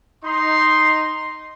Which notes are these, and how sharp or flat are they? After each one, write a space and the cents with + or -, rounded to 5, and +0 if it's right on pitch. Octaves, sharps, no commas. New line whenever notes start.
D#4 +0 C6 +0